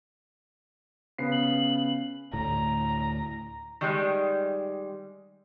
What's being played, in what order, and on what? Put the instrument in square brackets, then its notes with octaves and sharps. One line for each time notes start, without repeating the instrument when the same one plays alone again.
[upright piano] C#3 B3 C7
[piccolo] F#7
[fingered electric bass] D2 A2 [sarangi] A#5
[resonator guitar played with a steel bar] D#3 G3 G#3